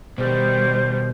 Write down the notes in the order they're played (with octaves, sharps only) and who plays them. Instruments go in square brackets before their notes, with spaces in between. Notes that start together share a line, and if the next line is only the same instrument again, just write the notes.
[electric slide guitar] B2 [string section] D#3 G3 [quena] C5